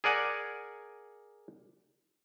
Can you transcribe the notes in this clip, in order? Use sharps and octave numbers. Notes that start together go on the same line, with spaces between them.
G#4 A#4 D5 F#5 G#5